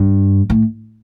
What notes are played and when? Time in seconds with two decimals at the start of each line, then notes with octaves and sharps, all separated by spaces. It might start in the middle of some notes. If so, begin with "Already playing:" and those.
Already playing: G2
0.50 A2